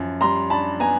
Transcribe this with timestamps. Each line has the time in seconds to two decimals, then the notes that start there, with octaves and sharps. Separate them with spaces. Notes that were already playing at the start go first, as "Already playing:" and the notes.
Already playing: F#2 F3
0.21 G3 A#5 C6
0.50 D4 A5 B5
0.80 B3 G#5 A#5